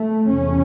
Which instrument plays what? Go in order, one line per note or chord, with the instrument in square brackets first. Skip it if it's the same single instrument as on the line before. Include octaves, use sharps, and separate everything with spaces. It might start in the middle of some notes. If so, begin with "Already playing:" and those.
Already playing: [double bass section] A3
E2 C3 C#4